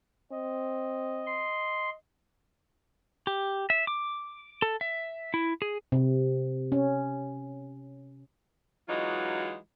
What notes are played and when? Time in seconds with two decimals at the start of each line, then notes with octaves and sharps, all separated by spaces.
0.32 C4 D#5
1.26 C6
3.27 G4
3.70 E5
3.87 D6
4.62 A4
4.81 E5
5.34 E4
5.62 G#4
5.92 C3
6.72 C#4
8.89 E3 F#3 G#3 D#4 F4 F#4